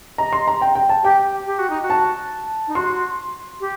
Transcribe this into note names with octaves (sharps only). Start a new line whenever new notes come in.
D#5 A#5
C6
A#5
G5
G5
A5
G4 G5
G4
F#4
D#4
F#4
A5
D#4
F#4 C6
G4